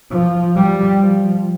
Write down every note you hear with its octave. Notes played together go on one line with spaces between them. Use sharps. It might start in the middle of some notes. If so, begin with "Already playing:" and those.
F3
G3
F3